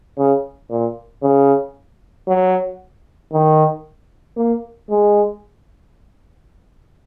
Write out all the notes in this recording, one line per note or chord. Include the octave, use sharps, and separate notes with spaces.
C#3
A#2
C#3
F#3
D#3
A#3
G#3